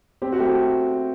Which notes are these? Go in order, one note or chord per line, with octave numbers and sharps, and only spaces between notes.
C4 G4
F#4
A3 G4